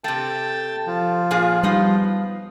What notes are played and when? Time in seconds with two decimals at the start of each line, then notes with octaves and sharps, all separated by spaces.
0.04 C3 A3 G5 A5
0.87 F3
1.31 A#2 F4 G#4
1.63 G3 B3 D#4 F4